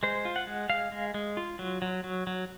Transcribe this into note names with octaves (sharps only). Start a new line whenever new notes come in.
G#3 C5
F4
F#5
G#3
G#3 F5
G#3
G#3
F4
F#3
F#3
F#3
F#3